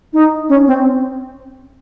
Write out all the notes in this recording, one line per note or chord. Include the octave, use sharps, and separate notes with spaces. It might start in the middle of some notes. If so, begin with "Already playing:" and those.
D#4
C#4
C4